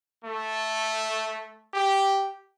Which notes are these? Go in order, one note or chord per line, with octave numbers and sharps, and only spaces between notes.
A3
G4